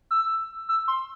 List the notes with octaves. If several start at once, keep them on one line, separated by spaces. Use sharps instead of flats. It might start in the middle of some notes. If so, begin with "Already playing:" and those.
E6
E6
C6